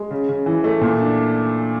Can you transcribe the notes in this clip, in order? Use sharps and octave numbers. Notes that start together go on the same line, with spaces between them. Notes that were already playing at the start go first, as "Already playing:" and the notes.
Already playing: G#3
C#3
C#3
E3
A3
A#2
D4